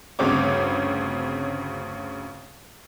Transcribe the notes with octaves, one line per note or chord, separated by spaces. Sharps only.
G1 D2 C#3 C4 C#5 D6